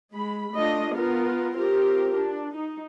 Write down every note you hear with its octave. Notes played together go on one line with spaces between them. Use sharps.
G#3 B5
A3 D4 F4 D#5
B3 F4 A#4
C4 F4 G4 A#4
D4
D#4